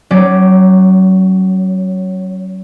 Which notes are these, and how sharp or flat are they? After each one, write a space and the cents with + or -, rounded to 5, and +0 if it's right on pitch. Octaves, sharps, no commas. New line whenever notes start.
F#3 +30 C#4 +0 D5 +0